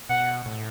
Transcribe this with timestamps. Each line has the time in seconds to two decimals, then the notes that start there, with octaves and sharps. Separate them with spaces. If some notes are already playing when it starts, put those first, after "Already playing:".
0.10 B2 F#5
0.46 A2